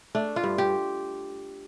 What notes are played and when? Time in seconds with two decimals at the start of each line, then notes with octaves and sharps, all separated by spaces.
0.15 A3 D4
0.36 F4
0.44 G2
0.58 G4